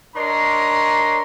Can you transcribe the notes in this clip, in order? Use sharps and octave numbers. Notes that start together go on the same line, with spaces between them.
D4 A#4 C#5 D#5 A#5 C6